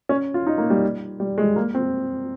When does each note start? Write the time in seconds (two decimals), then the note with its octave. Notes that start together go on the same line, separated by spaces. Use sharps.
0.09 C#4
0.34 F4
0.47 D#4
0.58 A#3
0.70 G3
1.20 G3
1.38 G#3
1.56 A#3
1.75 C4